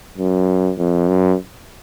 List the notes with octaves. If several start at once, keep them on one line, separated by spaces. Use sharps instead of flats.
F#2
F2
F#2